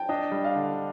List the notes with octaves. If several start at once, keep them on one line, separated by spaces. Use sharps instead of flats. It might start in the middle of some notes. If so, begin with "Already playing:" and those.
Already playing: G5 A5
D4 D#5
G3
F5
D3